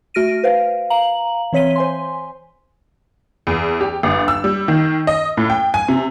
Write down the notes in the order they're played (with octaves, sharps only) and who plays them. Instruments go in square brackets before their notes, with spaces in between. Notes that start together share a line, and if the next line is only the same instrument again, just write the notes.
[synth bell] A3 F#4 F6 A#6 D7 D#7
B4 C5 F5
F5 A#5 F#7
E3 C4 C#5 B6 D#7 G7
C5 G#5 C6
[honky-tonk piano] E2
G4
G1
E6
G3
D#3
D#5
A2
G5
G#5
C3